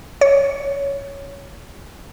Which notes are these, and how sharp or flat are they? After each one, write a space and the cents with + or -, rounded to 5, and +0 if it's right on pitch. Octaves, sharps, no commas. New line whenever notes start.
C#5 +5